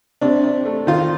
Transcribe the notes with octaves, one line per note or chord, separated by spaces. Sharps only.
C3 D4
C3
A3
D#3 F4